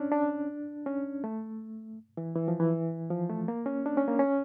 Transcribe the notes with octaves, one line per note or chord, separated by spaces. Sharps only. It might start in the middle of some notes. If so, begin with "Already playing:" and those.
Already playing: C#4 D4
D4
C#4
A3
E3
E3
F3
E3
F3
A3
A#3
C#4
D4
C#4
A#3
C#4